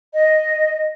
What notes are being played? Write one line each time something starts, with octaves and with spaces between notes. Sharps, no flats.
D#5